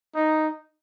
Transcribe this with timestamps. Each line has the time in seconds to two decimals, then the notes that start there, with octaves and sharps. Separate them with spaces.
0.15 D#4